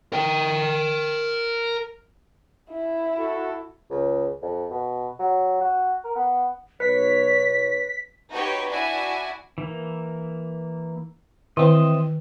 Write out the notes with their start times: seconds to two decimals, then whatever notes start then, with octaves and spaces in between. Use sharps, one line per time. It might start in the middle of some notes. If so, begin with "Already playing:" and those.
0.13 A#4 G5
2.70 E4
3.18 F#4 A4
3.90 C#2
4.42 F2
4.70 B2
5.19 F#3
5.61 F#4
6.04 A#4
6.15 B3
6.80 B1 B4 C#5 B6
8.31 D#4 F#4 G4 B4 C#5
8.69 D4 E4 F#4 G#5
9.58 E3 A#3
11.57 D#3 E3 C4 D#5 E5 C6